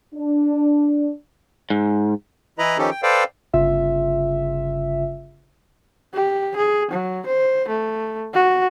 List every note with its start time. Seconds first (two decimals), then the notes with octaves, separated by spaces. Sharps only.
0.15 D4
1.70 G#2
2.59 E3 E4 B4 D#5 A#5 B5
2.78 D#3 F3 C#4 D#4 G4 A4
2.90 G5
3.03 A4 B4 C5 D5 F5 G5
3.54 G1 C#3 F4 E5
6.14 G4
6.56 G#4
6.91 F#3
7.26 C5
7.68 A3
8.34 F#4